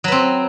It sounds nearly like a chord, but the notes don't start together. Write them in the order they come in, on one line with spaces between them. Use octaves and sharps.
F#3 B4 C4